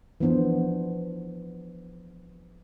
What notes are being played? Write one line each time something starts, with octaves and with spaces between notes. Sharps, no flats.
E3 F3 B3 D4 C5